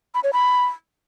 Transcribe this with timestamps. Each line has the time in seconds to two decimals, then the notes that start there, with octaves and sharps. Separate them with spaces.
0.14 B5
0.24 C#5
0.33 B5